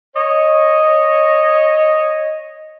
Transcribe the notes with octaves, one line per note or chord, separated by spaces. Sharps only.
C#5 D#5